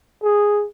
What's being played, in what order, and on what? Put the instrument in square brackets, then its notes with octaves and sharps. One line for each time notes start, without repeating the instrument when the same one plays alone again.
[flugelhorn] G#4